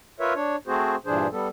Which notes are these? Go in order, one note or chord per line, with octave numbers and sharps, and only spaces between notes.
F4 A#4 B4 C#5 E5
D4 C#5
A3 C4 F#4 G#4 C5
G2 A#2 E3 D4 G#4 C5
G3 B3 A4